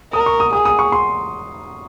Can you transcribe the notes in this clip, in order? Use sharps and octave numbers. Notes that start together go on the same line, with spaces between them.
A#4 D#6
C#6
D#6
G#4 D#6
D#6
C#6
C6